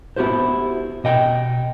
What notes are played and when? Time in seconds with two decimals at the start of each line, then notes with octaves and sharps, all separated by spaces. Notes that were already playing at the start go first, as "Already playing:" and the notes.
0.16 B3 E4 F#4 G4 C5
1.04 B2 D#5 G5